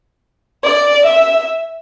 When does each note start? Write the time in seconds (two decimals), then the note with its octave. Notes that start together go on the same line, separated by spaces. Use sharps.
0.64 D5
1.06 E5